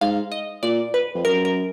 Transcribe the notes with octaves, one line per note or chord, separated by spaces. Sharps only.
G#2 F5
D#5
A#2 D5
B4
F2
F#2 A#4
A#4